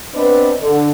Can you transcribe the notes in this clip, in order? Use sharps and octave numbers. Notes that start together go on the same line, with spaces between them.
B3 C4 D4 B4 D#5
D3